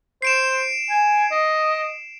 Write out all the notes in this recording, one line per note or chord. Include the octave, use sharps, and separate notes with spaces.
C5 C7 D7 E7
G#5
D#5